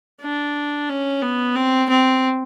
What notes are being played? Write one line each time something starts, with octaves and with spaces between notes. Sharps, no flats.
D4
C#4
B3
C4
C4